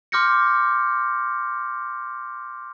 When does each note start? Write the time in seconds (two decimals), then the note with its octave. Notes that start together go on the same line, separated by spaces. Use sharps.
0.12 C6 D6 F6 G6 A#6 C#7